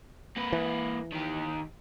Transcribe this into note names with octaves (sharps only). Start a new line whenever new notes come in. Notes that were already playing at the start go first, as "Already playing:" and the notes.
A#3 B4
E3
D#3 G4